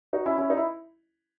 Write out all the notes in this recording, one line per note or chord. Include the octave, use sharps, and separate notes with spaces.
D#4 F#4
C#4 E4
C#4 E4
D#4
E4